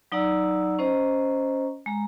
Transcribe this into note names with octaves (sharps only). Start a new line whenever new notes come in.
F#3 D#4 D5 F#5 A#5 E6
C#4 C5 D#5 A#5
G#3 A#5